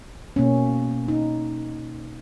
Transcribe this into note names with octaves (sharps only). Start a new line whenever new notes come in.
B2 A#3 C#4
D#4